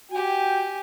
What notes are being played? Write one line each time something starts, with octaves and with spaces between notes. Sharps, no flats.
F#4 G4 G5 G#5